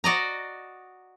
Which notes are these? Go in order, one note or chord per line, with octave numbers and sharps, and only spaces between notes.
F#4 D5 D#5 A#5